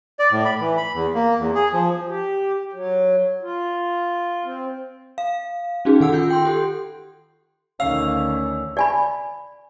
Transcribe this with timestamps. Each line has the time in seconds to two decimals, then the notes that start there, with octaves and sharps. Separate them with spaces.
0.19 D5
0.32 A2
0.45 B5
0.60 E3
0.77 B5
0.94 E2
1.14 A#3
1.39 E2
1.55 G#4
1.73 F3
2.08 G4
2.74 F#3
3.42 F4
4.45 C4
5.18 F5
5.85 C#4 D#4 F#4 G#4
6.00 D#3 A4 F#5 E6
6.13 F4 G6
6.30 G5 C6
6.45 G4 A4
7.80 D2 D#3 C#4 F5 E6
8.77 D5 G#5 B5